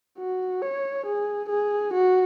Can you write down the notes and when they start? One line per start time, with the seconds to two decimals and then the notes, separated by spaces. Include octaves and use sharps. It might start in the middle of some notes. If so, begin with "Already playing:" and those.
0.19 F#4
0.62 C#5
1.06 G#4
1.49 G#4
1.93 F#4